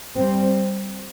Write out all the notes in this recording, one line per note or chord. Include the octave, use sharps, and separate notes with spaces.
G3 C4